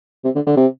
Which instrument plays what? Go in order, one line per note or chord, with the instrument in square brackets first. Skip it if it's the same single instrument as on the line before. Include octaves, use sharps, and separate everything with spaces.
[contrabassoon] C3
D3
D3
C3